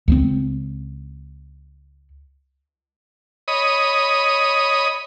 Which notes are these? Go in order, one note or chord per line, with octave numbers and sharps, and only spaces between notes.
C#2 F3 C4
C#5 D#5 B5 D#6